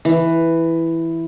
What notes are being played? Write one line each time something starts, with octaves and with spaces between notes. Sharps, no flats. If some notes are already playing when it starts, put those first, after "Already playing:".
E3